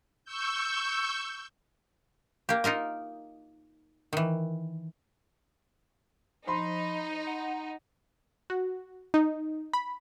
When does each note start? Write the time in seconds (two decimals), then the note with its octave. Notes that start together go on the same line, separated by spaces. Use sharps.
0.25 C#6 E6 G6
2.49 A#3 G4
2.64 D#4 F4 A#4 D#5
4.13 D#3 E3
6.47 F3 D#4 B5 C6
7.27 F#5
8.50 F#4
9.14 D#4
9.74 B5